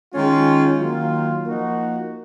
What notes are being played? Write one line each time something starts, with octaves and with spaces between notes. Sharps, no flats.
D#3 G#3 C#4 F4
D#3 F#3 A#3 F4
F3 A#3 D#4 F#4